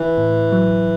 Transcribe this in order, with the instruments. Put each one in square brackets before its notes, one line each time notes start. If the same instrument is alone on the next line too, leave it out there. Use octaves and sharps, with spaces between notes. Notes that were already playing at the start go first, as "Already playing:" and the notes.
Already playing: [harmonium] E3
[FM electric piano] A2
F#3